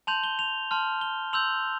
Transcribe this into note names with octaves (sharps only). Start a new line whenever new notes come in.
A5 C6 G6 F7
G7
F7
A5 C6 F6
G7
C6 E6 G6 F7